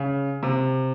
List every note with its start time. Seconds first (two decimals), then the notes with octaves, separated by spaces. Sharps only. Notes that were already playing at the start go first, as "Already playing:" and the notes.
Already playing: C#3
0.43 C3